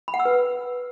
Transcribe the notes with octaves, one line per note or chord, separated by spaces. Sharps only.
B5
F#5
E6
B4